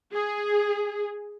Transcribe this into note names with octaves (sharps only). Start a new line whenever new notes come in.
G#4